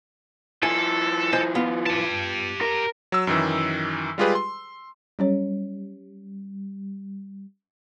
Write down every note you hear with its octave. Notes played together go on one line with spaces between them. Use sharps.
F3 E4 A4 G#5
C5 D#5 G#5
B3 F4
G4 A5
A#4
F#3 E6
F#2 D#3 E3
G3 G#3 F4 G4 G#4 B4
C6
F#3 G3 C#4 C#5